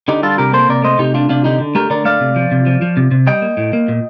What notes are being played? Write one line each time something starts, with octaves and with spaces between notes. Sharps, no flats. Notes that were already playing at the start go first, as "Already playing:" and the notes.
D3 D#4 G4
G3 F4 A4
C3 G4 A#4
A#3 A4 C5
C3 A#4 D5
A3 C5 D#5
C3 D#4 G4
A3 D4 F4
C3 D4 F4
D3 D#4 G4
D3
A3 G4 A#4
D3 A#4 D5
A3 D5 F5
C3
F3
C3
F3
F3
C3
C3
G3 D#5 G5
A#3
A2
A#3
A#2